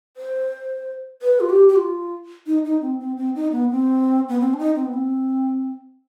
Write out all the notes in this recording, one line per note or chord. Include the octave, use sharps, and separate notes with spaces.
C5
B4
F4
G4
G4
F4
D#4
D#4
C4
C4
C4
D#4
B3
C4
B3
C4
D4
D#4
C4
B3
C4